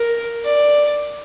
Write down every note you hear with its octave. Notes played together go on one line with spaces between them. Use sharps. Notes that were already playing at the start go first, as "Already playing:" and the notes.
Already playing: A#4
D5